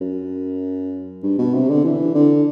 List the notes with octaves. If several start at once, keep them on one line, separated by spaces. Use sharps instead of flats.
F#2
G2
B2
C3
D3
E3
D3